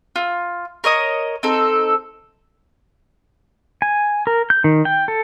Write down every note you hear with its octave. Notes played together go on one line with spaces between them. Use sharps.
F4
A#4 C#5 D#5 D#6
C4 D#4 A4
G#5
A#4
G6
D#3
G5
A4